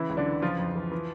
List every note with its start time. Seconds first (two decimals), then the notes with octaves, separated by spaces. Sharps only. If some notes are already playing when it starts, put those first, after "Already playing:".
Already playing: C#3 E3 E4
0.09 C#2
0.17 D3 D4
0.26 E3
0.42 C#3 F3 F4
0.58 F2
0.76 E3
0.92 E3